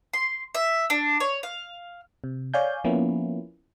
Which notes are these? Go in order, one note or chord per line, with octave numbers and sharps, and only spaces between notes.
C6
E5
D4
C#5
F5
C3
C#5 D5 F5 G#5 G6
F3 A#3 B3 C#4 E4